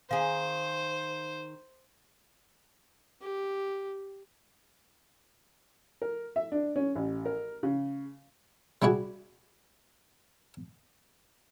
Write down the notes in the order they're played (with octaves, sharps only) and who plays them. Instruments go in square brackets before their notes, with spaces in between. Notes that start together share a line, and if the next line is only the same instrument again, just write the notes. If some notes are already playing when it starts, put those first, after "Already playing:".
[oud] D#3 G#4 [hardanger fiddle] C5 [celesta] F5
[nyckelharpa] G4
[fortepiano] A#4
E5
D4
C#4
A1
A#4
C#3
[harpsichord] G3 D4 E4 F#4 G#4